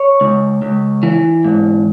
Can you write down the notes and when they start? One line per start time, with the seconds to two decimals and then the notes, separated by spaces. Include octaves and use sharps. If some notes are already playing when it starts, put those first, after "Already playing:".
Already playing: C#5
0.21 C#2
0.62 C#2
1.03 E3
1.45 G#2